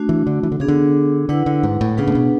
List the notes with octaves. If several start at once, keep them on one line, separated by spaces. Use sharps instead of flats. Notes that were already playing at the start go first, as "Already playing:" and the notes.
Already playing: A3 D4 F#4
E3
D3
E3
D3
C#3 B3 D4 G#4
D3
D3 E4 B4 F#5
D3
G#2
A2
C#3 B3 D4 G#4 B4 F#5
A2
B2